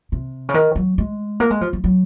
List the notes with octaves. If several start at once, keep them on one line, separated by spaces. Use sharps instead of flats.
C3
C#3
D#3
F#3
G#3
A#3
G#3
F3
F3
F#3